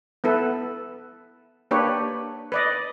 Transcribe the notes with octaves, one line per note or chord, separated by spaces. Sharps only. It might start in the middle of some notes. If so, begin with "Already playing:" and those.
B3 E4 A4 B4
A#3 D4 G4 B4 C#5
B4 D5 D#5